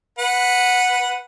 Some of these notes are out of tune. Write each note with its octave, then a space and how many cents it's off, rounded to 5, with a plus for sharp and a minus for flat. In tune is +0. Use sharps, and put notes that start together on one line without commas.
B4 +0 F#5 -10